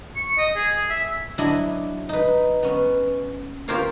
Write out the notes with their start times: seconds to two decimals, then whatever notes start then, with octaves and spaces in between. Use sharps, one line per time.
0.16 C#6
0.38 D#5
0.56 G#4
0.90 E5
1.38 F#3 D4 E4 D#5
2.09 D#4 B4
2.63 B3 C#4
3.68 F4 G4 A#4 C5 C#5 F5